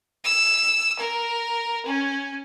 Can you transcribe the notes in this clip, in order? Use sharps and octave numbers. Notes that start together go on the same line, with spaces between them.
E6
A#4
C#4